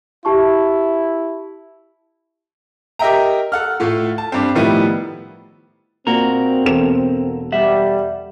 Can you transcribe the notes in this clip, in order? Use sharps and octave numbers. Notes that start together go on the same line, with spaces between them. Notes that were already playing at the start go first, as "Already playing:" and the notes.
E4 G4 A5 C#6
G4 A#4 D#5 E5 G5 A#5
A4 F#5 F6
A2 A3 F4
A5
G2 C4
A2 D#3 F3 G3 B3 E4
A#2 A#3 C4 F#4 A#4
E1 A4 E7
G3 E5 F#5